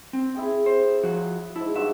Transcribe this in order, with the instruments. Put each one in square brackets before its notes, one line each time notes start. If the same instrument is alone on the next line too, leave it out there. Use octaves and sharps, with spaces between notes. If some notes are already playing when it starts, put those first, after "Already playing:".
[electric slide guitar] C4
[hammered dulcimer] E4 G#4 G5
[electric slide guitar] C5
F3 F#4
[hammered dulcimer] G#2 A5 [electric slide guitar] E4
[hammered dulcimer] G2 F4 F#4 [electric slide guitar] E5